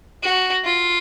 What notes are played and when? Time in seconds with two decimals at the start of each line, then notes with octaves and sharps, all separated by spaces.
0.23 F#4
0.65 F4